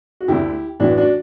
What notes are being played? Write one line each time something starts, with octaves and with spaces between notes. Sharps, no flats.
F#4
D2 D3 E4 G4
A1 A2 E3 D4 F#4
D4 F#4